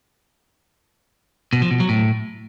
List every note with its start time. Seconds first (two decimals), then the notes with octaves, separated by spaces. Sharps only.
1.53 B2
1.62 F3
1.71 B2
1.80 F#3
1.89 A2